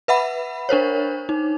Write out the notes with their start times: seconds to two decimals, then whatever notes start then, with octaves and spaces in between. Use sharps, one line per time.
0.08 B4 E5 F#5 B5
0.69 D4 A#4 C5 C#5
1.29 D#4